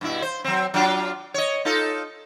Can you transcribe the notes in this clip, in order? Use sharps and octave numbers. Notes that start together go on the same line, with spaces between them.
G2 B2 E4
C5
F#3 C4
F#3 D4 F4
C#5 D#5
D#4 F4 A4